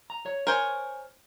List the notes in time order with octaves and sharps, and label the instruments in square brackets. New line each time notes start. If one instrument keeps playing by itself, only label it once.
[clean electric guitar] A#5
C#5
[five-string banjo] A#4 C5 C#5 [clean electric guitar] G#5